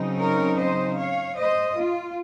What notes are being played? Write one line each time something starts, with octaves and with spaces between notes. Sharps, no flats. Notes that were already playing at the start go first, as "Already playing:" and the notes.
Already playing: C#3 F#3 C4 D#4
A#4 C#5
C5 D#5
C#5 F5
C5 D#5
F4